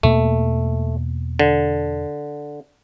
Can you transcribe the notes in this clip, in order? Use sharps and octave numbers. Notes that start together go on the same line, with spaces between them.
E2 B2 A3 A#3
D3